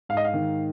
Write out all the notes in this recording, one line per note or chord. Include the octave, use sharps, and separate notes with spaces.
G#2 F5
D#5
F5
D#3